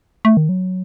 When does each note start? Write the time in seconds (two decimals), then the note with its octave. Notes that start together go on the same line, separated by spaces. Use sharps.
0.25 A3
0.37 D#3
0.49 F#3